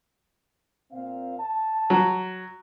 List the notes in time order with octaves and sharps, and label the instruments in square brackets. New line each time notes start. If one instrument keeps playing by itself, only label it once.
[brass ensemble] A#2 C4 F5
A5
[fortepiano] F#3